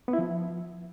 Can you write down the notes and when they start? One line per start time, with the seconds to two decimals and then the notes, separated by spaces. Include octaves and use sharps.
0.08 B3
0.13 E4
0.19 F3